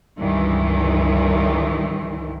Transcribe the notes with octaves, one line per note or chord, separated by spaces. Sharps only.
C#2 G2 D#3 E3